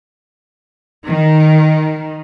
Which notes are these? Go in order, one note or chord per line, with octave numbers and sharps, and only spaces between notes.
D#3